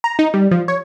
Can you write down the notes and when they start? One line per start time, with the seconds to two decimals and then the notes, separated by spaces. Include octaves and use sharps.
0.04 A#5
0.19 D#4
0.34 G3
0.51 F3
0.68 C#5